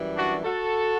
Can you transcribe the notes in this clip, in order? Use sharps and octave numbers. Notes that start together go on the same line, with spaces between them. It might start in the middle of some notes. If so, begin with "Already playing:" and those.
Already playing: F#2 E3 G3
D4 F#4
F#4 A4